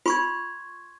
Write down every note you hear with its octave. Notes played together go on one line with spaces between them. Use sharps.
F4 C6 C#6 G#6